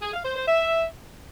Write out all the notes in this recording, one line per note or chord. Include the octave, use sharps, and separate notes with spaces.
G#4
F5
C5
C5
E5